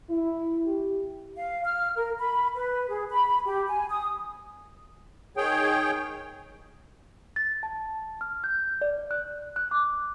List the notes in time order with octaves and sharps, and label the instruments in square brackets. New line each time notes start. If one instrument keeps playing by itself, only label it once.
[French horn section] E4
G4
[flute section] F5
F6
A#4
B5
B4
G#4
B5
G4
G#5
D#6
[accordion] D#3 G#4 C#5 G5
[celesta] A6
A5
F6
G6
D5
F#6
F#6
D6